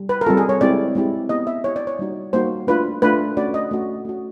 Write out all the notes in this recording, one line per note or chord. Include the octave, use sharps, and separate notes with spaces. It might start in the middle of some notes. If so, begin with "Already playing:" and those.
Already playing: G3
B4
A#4
G3 C4 F4 A4
G#4
C#5
G#3 C4 E4 G4 D5
G#3 C4 E4 G4
B3 E4 G4 D#5
E5
B3 E4 G4 C#5
D5
C#5
G3 A#3 D#4 F#4
G3 A#3 D#4 F#4 C5
A3 D4 F4 B4
A3 D4 F4 B4
A3 C#4 F#4 D5
D#5
A3 C#4 F#4
A3 C#4 F#4